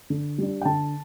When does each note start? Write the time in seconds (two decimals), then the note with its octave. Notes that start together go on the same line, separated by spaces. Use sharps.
0.10 D3
0.38 G3 D4
0.61 G5
0.65 D3 A5